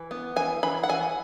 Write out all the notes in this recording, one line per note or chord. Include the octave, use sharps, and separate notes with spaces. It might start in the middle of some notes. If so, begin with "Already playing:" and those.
Already playing: E3
B3
E3 G#5
E3 B5
F#5
E3 G#5